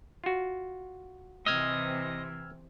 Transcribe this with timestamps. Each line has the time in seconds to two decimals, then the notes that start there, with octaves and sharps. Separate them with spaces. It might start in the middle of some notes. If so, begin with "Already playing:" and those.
0.24 F4 F#4
1.46 C3 E3 D#5 E6 F6 G#6